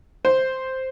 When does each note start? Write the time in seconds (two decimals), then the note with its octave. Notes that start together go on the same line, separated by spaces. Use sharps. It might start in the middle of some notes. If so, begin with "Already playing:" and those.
0.25 C5